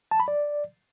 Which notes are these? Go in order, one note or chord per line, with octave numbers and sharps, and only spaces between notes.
A5
B5
D5